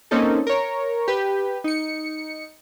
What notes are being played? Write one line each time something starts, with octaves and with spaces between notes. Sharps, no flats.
A#3 C4 C#4 D#4 A4
A#4 C#5
G4 B4
D#4 C#7